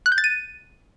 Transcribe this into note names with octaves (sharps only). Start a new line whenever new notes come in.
F#6
G6
A6
D#7